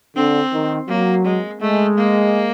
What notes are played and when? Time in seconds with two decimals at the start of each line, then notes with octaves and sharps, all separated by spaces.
0.16 D3 C4
0.53 D#3
0.89 F#3 A#3
1.25 G#3
1.61 G#3 A3
1.98 A#3